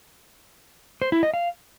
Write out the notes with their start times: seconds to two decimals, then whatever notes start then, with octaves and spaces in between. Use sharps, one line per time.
1.02 C5
1.12 E4
1.23 D#5
1.34 F5